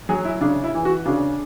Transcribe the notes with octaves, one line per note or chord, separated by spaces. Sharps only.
F#3 G#4
E4
C#3 D4
E4
E3
F#4
C#3 D4